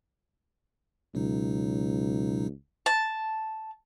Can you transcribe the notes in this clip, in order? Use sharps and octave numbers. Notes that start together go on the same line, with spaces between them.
C#2 B2 F#3 D#4
A5